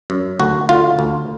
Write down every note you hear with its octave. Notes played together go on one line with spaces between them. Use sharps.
F#2
D2 F#4
D3 F4
D2